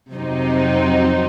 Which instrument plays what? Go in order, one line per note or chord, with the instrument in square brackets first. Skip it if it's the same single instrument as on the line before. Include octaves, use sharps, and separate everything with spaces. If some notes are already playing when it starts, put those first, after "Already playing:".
[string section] F2 C3 F#3 C4 D#4